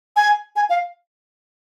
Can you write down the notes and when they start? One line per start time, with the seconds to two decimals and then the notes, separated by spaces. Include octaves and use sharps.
0.16 G#5
0.56 G#5
0.69 F5